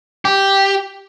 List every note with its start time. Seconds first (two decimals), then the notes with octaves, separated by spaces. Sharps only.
0.25 G4